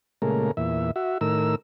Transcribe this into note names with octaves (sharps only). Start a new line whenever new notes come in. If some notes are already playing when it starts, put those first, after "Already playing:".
A#2 C#3 G#3 A3 A#4
E2 A#2 E5
F#4 E5
A2 D#3 A#4 E6